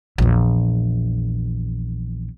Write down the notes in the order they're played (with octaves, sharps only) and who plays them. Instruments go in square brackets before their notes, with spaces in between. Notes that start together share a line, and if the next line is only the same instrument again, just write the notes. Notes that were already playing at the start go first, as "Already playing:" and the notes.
[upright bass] A#1 E2